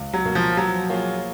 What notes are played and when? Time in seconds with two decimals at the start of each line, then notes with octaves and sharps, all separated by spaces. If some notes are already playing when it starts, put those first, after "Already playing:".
Already playing: C#2
0.13 F#3
0.24 B2 A#3
0.35 F3
0.57 F3 F#3
0.90 A#3 F4 G#4 C#5